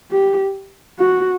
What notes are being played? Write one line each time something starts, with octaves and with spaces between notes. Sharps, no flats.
G4
F#4